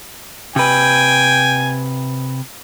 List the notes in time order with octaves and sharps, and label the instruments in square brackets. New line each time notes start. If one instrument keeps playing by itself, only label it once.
[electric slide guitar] C3 B4 [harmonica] G5 G#5